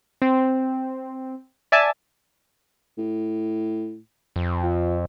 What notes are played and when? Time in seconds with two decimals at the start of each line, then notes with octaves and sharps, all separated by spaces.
0.22 C4
1.72 D5 E5 G#5 A5
2.98 A2
4.36 F2
4.63 F3